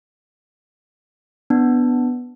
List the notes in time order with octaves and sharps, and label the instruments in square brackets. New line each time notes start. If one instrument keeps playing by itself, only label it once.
[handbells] B3 D4